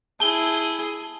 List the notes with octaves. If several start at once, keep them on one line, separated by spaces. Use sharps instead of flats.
E4 G#4 A5 G7